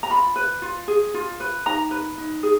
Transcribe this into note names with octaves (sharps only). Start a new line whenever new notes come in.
A#5
F4 B5
B4
F4
G#4
F4
B4
D#4 A#5
B4
D#4
G#4